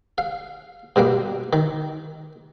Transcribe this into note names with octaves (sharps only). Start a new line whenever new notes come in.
F5
G2 B2 G3 A#3
D#3